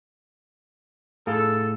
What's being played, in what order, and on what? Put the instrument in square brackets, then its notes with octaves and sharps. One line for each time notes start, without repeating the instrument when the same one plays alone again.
[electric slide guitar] A2 G#4 F5 [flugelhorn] A4